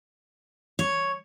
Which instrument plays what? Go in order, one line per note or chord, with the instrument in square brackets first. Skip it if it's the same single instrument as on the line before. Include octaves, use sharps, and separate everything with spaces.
[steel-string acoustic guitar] C#5